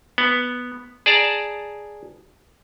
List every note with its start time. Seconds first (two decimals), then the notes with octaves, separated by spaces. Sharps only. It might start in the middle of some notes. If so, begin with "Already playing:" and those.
0.18 B3
1.06 G#4 D5 A5 A#5